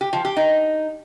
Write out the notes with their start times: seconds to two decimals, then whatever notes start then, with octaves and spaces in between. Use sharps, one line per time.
0.01 G4
0.13 F3
0.25 G4
0.37 D#4